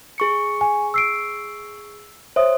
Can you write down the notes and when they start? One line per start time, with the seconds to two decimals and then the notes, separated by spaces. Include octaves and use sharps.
0.18 G#4 C#6 C#7
0.61 G#5
0.94 E6 C7 D7
2.36 C5 C#5 E5 D#6